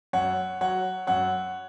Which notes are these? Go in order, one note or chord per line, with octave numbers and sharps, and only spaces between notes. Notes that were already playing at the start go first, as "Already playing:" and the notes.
F#2 C#5 F#5
F#3 C#5 F#5
F#2 C#5 F#5